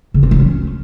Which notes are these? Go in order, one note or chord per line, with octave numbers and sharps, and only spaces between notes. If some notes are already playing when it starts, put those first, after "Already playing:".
C#3
C4
F#3
C#4